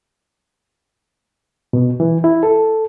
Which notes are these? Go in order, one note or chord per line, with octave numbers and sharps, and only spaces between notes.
B2
E3
E4
A4